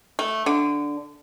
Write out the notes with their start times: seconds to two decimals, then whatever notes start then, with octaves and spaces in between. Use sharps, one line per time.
0.19 A3
0.46 D3